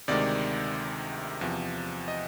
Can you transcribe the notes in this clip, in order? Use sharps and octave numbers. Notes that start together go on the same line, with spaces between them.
D2 C3 D#3 G#3 D5
E2 C3 F3
D#5